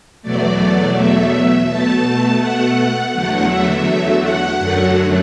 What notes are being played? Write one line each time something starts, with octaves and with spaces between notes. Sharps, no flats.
E2 B2 F#3 A3 D5
E5
B2 A3 A5
F#5
E2 D3 F#3 A3 F#5
E5
F#5
F#2 D3 F#3 A3